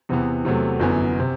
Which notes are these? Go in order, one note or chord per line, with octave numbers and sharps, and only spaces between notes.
E2 C3 E3 B3
E2 C3 F#3 A3
G1 F#2 E3 B3
C3